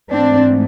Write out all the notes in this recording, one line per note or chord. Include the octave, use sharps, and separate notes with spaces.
G#2 E3 A3 C4 D4